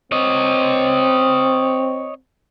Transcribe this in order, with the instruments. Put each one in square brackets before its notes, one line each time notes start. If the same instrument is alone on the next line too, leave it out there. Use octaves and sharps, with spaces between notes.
[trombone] C4 [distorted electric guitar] C#5 D#5